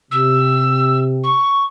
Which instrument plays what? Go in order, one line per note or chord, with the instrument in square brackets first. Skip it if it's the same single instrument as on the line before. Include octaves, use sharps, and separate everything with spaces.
[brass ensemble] C3 [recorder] E6
[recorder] C#6